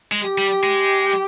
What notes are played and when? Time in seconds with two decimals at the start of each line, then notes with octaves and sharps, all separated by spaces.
0.12 G#3
0.24 G4
0.38 G3
0.63 G#3